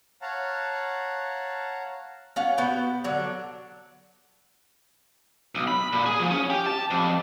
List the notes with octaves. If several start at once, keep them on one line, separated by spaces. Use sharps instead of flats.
C#5 F5 F#5 A5 A#5
C#4 F4 F#5
B3 F#4 B4 G5
D3 F#3 D4
B1
B5
A#2
G#4
F3
C#4
G4
A5
F2